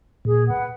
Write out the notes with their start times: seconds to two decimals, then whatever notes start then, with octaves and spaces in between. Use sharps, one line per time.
0.25 A#2 G#4
0.47 B4 F#5